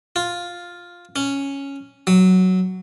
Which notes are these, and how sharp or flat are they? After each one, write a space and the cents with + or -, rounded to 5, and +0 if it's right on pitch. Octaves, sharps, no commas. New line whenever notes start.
F4 +5
C#4 +0
F#3 +5